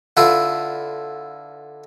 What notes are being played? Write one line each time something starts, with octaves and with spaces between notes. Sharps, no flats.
D3 E4 F4 B4